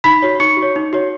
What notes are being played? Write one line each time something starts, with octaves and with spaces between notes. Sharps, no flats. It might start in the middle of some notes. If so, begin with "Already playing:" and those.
D#4 B5 B6
F#4 C#5
D#4 C#6 C#7
F#4
C#5
D#4
F#4 C#5